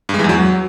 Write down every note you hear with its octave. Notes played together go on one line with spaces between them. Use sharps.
G2
G#3
E3
E2
F#3